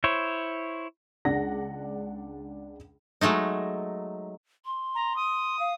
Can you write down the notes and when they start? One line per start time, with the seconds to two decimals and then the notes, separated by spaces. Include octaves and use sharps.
0.04 E4 C5 C#5
1.25 C#2 G#3 D4 F#5 A#6
3.21 F#3 G#3 A3 D#4
4.66 C6
4.95 A#5
5.16 D#6
5.59 F5